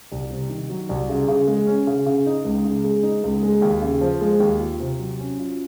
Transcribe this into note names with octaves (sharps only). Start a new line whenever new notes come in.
C2
C3
D#3
F#3
C2
C#3
C#3
G#3
C#4
C#3
C#3
D#4
C#2
C#3
G#3
D#4
C#2
G#3
D#2
C#3
F3
G#3
D#2
F4
C3
F#3
C#4
F4